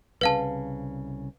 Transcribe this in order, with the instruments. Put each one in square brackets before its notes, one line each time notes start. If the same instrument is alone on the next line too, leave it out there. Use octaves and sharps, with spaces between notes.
[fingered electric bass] C2 C#3 [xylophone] B4 F5 A5